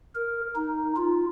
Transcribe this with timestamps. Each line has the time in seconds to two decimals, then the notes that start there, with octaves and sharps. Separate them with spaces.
0.15 A#4
0.55 D#4
0.96 F4